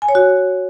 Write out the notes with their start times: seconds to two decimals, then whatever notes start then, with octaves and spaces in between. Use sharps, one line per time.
0.02 G#5
0.09 C#5
0.15 F#4